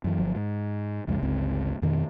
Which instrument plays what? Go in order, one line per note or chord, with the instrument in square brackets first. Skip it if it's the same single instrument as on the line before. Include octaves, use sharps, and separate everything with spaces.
[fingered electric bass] F#2 E3
G1 F3 F#3
G#2
C2 F2 C#3 G#3
G1 C#2 C4
F2 B2 D#3